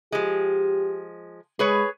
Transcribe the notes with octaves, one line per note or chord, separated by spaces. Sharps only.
F3 G#3 G4
G#3 G#4 B4 C#5